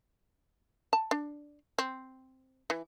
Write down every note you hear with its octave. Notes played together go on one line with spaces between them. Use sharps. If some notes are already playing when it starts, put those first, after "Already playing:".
A5
D4
C4
E3